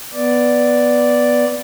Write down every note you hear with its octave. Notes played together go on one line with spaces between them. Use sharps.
B3 D5